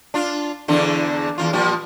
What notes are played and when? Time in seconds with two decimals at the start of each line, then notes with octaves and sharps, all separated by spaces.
0.14 D4 F4
0.68 E2 D3 D4
1.38 E2 G2 F4
1.53 A#2 F3 G3